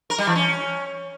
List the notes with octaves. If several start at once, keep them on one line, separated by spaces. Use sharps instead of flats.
A#4
G3
E3
C#4